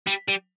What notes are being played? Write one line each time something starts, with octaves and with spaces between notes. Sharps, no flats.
G3
G3